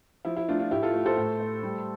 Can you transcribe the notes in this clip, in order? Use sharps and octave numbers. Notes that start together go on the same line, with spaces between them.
F3 E4
E4
A3 D4 F4
D4 F4
A2 E4 G4
F4 A4
A3
A4 C5
A2
A3
G3